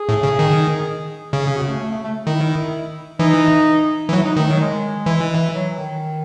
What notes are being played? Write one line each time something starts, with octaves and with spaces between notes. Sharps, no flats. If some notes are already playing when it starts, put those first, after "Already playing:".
Already playing: G#4
A2
C#3
D#3
C#3 G#4
G#4
F#4
A3
A3
A3
A3
D#3 E4
E3 D#4
E3
F#3 E4
D#4
D#3 A3
F#3
G#3
E3
F#3
D#3